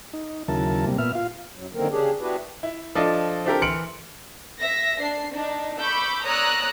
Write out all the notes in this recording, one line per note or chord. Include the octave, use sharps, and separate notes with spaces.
D#4
D#2 C#3 F#3 E4 A#4 A5
C3 G3 A#3
A#2 B3 E5 F6
F4 F5
F#2 F#3
F#2 D3 D#3 A#3 C4 A#4
C#3 C#4 D4 G4 G#4
B3 D4 E4 F#4 G4 B4
E4
F3 D4 A4 D5 D#5
C4 D4 E4 G4 A4 A#4
E3 C6 F6 C#7 D7 F#7
E5 A#6
D4 C7
D4 D#4
B5 C#6 D6 E6 G6
C#5 D5 A#5 D#6 E6 F#6